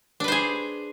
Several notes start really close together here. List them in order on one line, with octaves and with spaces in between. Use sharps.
D4 B4 C5 G#4